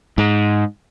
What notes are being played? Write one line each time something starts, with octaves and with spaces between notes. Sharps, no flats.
G#2